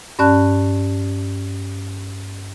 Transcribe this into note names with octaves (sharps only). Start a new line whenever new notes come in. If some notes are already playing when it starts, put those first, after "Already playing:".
G2 C#4 D5 A5 F#6